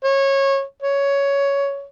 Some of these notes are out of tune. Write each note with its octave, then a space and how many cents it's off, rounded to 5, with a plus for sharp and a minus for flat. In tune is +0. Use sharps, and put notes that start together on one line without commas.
C#5 -20
C#5 +10